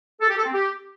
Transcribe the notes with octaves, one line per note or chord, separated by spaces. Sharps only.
A4
G4
A4
C4
G4